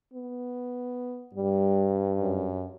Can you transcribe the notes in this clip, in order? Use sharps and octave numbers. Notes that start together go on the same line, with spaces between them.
B3
G2 G3
F#2